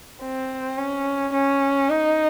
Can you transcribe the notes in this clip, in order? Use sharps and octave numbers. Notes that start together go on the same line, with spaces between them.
C4
C#4
C#4
D#4